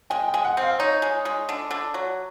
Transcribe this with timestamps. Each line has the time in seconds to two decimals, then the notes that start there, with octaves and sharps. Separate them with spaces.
0.10 G#3 G5
0.28 G5
0.34 G#3
0.44 F#5
0.57 C4 F5
0.79 D#4 C#5
1.02 G#3
1.25 G#3
1.49 D3
1.71 D3
1.94 F#3